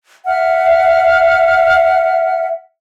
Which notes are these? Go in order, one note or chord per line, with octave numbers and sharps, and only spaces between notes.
E5 F#5 F6